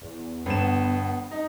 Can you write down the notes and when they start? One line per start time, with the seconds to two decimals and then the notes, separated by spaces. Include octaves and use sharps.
0.02 E2
0.46 G1 B3 E7
1.31 D#4